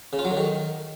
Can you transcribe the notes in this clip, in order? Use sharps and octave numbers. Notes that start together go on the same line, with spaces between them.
C#3
F4
F#3
D3
D#3